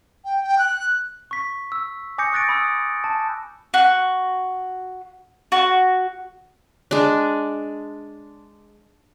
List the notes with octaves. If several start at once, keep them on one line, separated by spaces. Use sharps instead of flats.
G5
G5
F#6
C#6 B6
E6
G#5 D6 D#6 G6 A#6 C#7
C#6 F#6 A6 A#6 D7
B5 D#6 E6
A5
F#4
F#4
G#3 D4